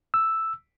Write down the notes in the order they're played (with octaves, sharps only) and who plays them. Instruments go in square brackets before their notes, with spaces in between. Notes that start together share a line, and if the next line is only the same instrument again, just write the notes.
[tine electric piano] E6